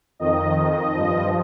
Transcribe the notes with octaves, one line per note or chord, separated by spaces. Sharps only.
F2 D#3 D#5
D#5
G2 F3